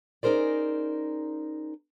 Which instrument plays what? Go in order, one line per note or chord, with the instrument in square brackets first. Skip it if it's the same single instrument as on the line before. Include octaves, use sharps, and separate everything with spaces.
[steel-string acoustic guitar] C#4 D#4 G#4 A#4 C5 D5